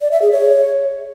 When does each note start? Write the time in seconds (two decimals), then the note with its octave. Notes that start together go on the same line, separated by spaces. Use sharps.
0.01 D5
0.11 E5
0.22 G#4
0.32 C#5